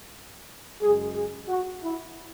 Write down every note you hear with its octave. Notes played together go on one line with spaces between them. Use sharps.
F#2 C#3 G#3 G#4
G#4
F#4
E4